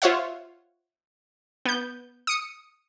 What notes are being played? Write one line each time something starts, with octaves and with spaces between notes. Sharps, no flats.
F4 C5 C#5 E5 F#5
B3 G6
D#6 C#7